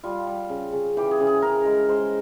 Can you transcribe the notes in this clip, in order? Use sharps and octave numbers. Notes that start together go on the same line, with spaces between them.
G3 F4
G3
C#3
C#3
E3 G4
G#4
C#3
G#4
C#3 A#4
G#3
G#3 C5